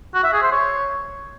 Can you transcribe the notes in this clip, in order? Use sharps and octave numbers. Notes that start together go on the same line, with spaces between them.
F#4
E5
G#4
C5
C#5